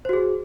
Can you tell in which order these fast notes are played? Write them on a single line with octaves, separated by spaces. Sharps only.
C5 F#4 G#4